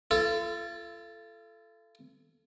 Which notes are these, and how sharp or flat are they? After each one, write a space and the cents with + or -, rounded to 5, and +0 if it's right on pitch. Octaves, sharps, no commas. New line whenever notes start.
F4 -40 A4 +0